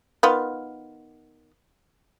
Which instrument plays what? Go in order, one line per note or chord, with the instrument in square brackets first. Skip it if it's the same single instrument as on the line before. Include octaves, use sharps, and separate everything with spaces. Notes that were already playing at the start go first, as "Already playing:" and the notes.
[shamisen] D#3 B3 F4